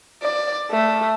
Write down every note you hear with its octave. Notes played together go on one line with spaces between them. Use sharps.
D5
A3